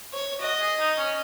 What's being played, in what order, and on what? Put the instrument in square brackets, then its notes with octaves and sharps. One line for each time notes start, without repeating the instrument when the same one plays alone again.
[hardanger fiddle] C#5
[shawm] F#4 [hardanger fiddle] D#5
[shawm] G#4
D#4
C#4